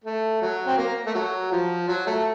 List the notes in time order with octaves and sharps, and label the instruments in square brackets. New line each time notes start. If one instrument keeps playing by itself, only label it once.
[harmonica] A3
F#3
C4
A#3
A3
F#3
F3
F#3
A3